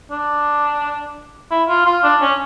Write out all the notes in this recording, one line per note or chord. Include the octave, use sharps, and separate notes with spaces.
D4
E4
F4
F4
D4
C#4